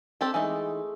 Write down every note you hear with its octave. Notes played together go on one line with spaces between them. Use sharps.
C4 G4 A4
E3 G#3 A3 D#4